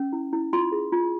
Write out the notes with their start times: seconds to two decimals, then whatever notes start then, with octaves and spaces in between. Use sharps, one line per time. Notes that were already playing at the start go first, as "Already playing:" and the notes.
Already playing: C#4
0.13 E4
0.33 E4
0.53 F4 C6
0.72 G#4
0.92 F4